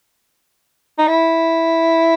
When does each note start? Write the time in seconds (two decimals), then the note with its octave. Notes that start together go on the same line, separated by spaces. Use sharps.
0.99 D#4
1.07 E4